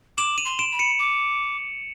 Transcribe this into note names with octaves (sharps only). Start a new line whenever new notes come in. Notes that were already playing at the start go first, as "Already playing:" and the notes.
D6 E7 F#7
D#7 F7
C6
D7 E7
B5
C#7 D#7
D6